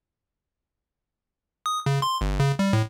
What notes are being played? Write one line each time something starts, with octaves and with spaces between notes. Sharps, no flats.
D#6
C#3
C6
G1
C#3
G3
A2